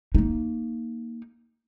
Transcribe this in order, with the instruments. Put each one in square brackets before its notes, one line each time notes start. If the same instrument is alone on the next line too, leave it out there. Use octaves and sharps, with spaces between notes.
[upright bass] A#3 D#4